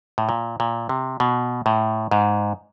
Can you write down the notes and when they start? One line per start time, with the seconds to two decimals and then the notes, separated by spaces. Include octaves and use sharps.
0.18 A2
0.29 A#2
0.60 A#2
0.89 C3
1.20 B2
1.66 A2
2.11 G#2